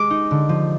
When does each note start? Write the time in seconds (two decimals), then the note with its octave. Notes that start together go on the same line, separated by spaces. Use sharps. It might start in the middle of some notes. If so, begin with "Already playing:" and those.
Already playing: G#3 D6
0.10 D#4
0.31 D3
0.49 F3